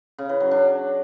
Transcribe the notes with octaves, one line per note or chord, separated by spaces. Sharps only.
C#3
E3
F#3
D4